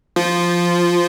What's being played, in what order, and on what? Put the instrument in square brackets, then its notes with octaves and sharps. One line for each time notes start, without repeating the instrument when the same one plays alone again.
[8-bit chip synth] F3 F4